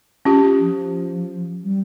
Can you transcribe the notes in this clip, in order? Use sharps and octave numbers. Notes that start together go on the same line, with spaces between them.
C#4 F4 G4
F3
G3